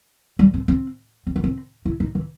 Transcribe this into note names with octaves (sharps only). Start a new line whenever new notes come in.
G3
C4
C4
C4
B3
C4
E4
D#4
E3